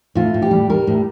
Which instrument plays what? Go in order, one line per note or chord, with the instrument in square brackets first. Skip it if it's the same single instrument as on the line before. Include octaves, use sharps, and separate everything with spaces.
[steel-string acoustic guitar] A2 F4
A2
G4
G3
G3 A#4
A2